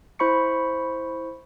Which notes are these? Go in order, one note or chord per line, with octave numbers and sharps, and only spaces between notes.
E4 C5 B5 C#6 C#7